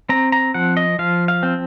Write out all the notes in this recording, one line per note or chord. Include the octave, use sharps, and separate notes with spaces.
C4 A#5
A#5
F3 F#5
D#5
F3 F5
F5
C4